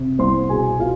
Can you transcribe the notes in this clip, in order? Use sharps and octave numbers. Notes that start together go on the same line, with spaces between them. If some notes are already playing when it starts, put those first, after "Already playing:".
Already playing: C3
C2 C5 C6
B2 G#4 G#5
B2 F4 F5